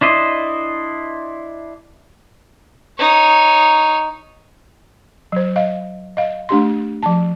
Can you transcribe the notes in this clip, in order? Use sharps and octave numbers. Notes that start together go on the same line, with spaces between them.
D4 E4 C5 D#5
D#4 C#5
F#3 C5
D#5 F5
D#5 F5
A3 D4 G4 C6
F3 A5